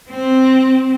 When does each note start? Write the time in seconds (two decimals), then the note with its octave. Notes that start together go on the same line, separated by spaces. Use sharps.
0.11 C4